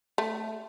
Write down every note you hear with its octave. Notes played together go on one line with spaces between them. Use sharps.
A3